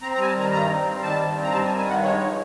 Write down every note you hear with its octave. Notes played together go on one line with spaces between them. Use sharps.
C4 A#5
A#5
G3 G#5
A5
D#3 A#5
G2 A#5
C4
G3
D#3 A5
G2
C4
A#5
G3 A5
G#5
D#3
G#5
G2 F#5
G#3 C#5
F3